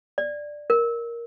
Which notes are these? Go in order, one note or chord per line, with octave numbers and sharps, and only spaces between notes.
D5
A#4